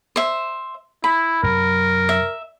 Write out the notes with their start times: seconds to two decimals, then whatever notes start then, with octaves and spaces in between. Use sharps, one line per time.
0.16 C5 E5
1.04 E4 B5
1.43 F#2 C3 F#3 A#4
2.09 E5